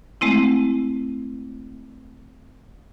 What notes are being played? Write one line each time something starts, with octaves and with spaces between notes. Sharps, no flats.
G#3 A3 C4 E4